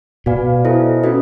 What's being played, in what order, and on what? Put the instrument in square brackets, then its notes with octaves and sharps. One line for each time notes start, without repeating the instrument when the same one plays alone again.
[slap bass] B2 [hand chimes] F#4 B4 D5 F5 G#5
[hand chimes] E4 A4 C5 D#5
C#4 F#4 B4 D#5